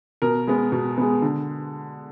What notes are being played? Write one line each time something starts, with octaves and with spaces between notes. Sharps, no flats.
B2 A#4
G#3 B3
B2
G#3 B3
D3